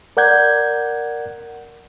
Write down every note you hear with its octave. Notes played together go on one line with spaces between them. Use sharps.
A#4 D5 F#5 G6 G#6